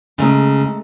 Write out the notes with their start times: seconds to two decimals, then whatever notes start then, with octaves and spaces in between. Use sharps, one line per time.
0.18 C#3 G#3 A3 A#5